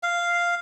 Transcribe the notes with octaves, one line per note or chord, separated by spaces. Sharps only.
F5